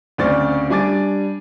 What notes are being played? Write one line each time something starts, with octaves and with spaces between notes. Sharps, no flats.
D2 C#3 C4 D5 C#6 A6
G3 D4 G#5 D6 A6